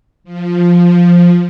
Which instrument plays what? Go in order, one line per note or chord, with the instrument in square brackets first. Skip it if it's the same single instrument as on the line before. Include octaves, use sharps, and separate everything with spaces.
[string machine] F3